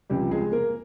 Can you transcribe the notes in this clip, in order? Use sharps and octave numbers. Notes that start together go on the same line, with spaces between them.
C#2 C3 F3 G3 G4
G#3 G#4
A#3 A#4